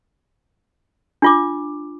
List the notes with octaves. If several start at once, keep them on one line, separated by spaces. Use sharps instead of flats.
D4 F4 D6